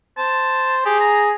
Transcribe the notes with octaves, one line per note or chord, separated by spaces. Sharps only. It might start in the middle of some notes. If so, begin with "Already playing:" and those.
C5 A5
G4 G#4
A#5